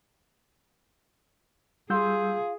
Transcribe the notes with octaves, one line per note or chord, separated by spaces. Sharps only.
G3 F4 G#4 E6 G6